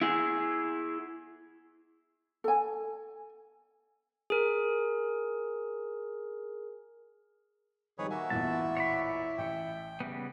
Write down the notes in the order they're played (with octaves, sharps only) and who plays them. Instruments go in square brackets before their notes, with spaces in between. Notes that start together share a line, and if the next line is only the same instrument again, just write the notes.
[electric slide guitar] E4 G#4
[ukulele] A4 G#5
[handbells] G#4 A#4
[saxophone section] F2 G#2 [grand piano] D#3 G3 [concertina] G#4 B4 C#5
[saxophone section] D#3 A#3 [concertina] F#4 E5 [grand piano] G#5
[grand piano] A1 E2 A#2 [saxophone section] E4 [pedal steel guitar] A5
[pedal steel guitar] C#5 D5 B5
[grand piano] A1 C#7 [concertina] G5
[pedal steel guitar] C#3 G3 B3